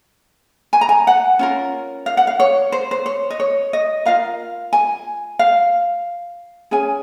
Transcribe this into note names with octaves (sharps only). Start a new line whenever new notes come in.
G#5
A#5
G#5
F#5
C#4 F4 A#4
F5
F#5
F5
C#5
C5
C5
C#5
D#5
C#5
D#5
F4 A#4 F5
G#5
F5
C#4 G#4 G#5